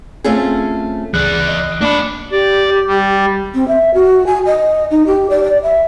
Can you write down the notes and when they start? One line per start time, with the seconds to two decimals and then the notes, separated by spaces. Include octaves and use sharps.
0.24 A3 C4 C#4 F4 G#4
1.14 C#2 E3 G#4 D5 F#6
1.48 D#5
1.81 A#3 D4 B5
2.32 G4 D5
2.87 G3
3.55 C4
3.68 E5
3.94 F#4
4.27 G#5
4.46 D#5
4.91 D#4
5.07 G4
5.30 D5
5.43 D5
5.63 E5